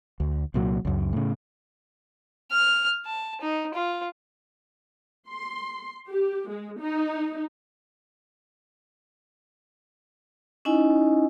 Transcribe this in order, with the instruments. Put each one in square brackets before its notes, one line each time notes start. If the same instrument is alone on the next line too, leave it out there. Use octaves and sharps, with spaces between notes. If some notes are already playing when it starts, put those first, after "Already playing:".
[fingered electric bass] D2
C2 A#2 F#3
C#2 F#2
A2 C#3
[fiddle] F6
A5
D#4
F4
[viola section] C6
G4
G#3
D#4
[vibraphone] C#4 D#4 E4 D#5 G#5